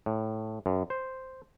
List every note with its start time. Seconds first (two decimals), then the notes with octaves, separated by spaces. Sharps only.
0.06 A2
0.66 F#2
0.90 C5